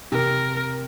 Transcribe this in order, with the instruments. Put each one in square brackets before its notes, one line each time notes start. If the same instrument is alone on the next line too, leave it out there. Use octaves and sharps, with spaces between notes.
[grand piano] C3 [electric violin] A#4